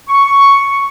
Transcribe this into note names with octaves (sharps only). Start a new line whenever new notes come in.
C#6